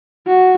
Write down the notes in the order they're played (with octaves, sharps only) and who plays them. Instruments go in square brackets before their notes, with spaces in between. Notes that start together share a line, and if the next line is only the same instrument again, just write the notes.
[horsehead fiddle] F#4